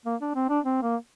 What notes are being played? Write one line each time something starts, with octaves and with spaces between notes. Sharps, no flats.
A#3
D4
C4
D4
C4
A#3